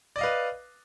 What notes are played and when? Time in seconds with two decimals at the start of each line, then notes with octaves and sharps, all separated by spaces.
0.16 D5
0.18 D#5
0.21 F5
0.24 B4